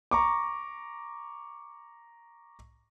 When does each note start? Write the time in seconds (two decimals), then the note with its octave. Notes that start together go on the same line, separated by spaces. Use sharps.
0.11 A#5 C#6 D6